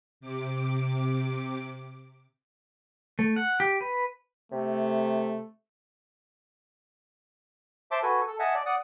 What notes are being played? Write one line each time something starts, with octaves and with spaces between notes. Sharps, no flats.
C3 D6
A3
F#5
G4
B4
C3 A3
C5 E5 A5 C6 D6
F#4 A4 B4 G#5
A4
D#5 E5 F#5 G#5 A5
D5
D5 F#5 D#6